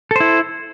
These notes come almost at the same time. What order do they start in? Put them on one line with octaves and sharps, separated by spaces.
A4 C5 E4